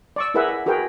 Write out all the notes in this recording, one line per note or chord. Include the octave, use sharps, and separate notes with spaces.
D5 C#6 E6
E4 G#4 A#4 B4 E5 F#5
F#5
F#4 G#4 A#4 B4 G5